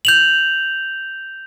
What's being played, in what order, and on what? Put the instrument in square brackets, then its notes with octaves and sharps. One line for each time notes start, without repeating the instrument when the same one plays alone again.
[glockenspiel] G6 F7 F#7